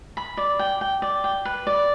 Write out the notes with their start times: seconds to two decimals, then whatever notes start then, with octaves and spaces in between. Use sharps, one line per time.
0.17 B5
0.37 D5
0.59 G5
0.81 G5
1.02 D5
1.24 G5
1.45 B4
1.67 D5